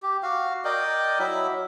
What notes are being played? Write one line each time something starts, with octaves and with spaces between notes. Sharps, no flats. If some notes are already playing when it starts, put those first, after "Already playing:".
G4
F#4 F5
A#4 D5 D#5 G5
F#3 E4 E5